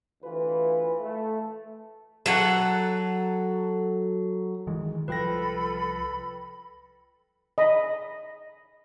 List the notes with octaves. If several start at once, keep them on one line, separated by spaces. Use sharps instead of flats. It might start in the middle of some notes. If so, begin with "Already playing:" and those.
D2 E3 F4 B4
A3
F#3 A4 F#5
D#3 E3 G#3
C2 F3 F4 A4 B4 G5 B5 A#6
D#5 B5